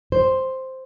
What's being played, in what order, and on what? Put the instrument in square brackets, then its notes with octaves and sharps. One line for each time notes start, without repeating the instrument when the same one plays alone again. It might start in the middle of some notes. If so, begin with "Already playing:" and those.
[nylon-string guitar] C5